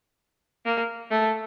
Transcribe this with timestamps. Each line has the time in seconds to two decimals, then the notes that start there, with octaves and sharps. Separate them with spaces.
0.65 A#3
1.11 A3